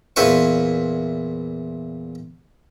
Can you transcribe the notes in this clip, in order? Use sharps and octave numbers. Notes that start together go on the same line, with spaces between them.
E2 A#2 E4 B4 C5 C#6